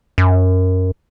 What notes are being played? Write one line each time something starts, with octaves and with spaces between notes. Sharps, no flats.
F#2